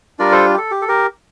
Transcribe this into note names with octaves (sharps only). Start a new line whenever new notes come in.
G3 D4 F4 A#4 D5
A4 C5
G4
A4
G4
A4
G4 A#4